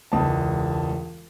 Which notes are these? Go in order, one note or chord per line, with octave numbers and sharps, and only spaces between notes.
E1 C#2 A5